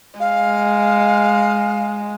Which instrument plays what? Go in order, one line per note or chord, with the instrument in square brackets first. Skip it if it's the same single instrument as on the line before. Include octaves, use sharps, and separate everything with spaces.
[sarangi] G#3 [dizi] F5